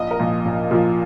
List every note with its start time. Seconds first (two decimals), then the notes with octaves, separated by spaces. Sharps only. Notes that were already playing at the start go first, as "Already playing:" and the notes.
Already playing: A#1 D#5
0.11 A#4
0.19 A#2 F3
0.45 A#1
0.71 A#2 F3